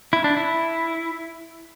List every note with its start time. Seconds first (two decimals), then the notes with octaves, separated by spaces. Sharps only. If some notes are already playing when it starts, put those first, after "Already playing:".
0.13 E4
0.24 D4
0.37 E4